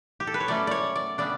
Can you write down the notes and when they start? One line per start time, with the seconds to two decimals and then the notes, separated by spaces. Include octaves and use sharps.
0.20 G4
0.27 A4
0.34 B4
0.40 C#5
0.48 B2 F#3 A3 C#4 D5
0.67 C#5 D5
0.96 D5
1.18 C#3 G3 B3 D4 D5